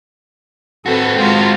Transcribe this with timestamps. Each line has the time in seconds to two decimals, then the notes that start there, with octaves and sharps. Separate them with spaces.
0.86 C4 F#4 A4 B4
1.17 G#3 C4 F4 F#4